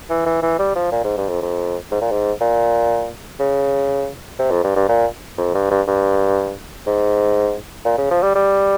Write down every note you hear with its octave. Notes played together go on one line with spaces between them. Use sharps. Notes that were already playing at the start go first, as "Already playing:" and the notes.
E3
E3
E3
G3
F3
A#2
G#2
G2
F2
F2
G#2
A#2
G#2
A#2
C#3
C3
F2
G2
G2
A#2
F2
G2
G2
G2
G#2
A#2
C#3
F3
G3
G3